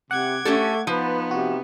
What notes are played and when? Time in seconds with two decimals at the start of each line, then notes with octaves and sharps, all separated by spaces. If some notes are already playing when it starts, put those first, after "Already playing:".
0.11 C3 F#5 D6 G#6
0.45 A3 C#4 G4 A4
0.87 F3 B3 D#4 B4
1.31 C3 F#4